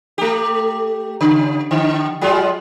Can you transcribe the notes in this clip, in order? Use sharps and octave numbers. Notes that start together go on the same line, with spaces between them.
A3 G4
C#3
D3
F#3 G#3 F4